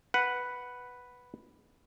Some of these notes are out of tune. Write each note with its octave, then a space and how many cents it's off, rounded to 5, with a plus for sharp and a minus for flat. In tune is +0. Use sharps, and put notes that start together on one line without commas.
B4 +0 F#5 +0